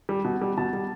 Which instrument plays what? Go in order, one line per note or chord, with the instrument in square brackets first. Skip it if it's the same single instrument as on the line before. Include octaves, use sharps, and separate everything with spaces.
[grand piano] G3
B2
G3
B2 A5
G3